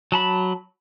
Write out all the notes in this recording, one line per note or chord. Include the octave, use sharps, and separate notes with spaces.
F#3 A5 B5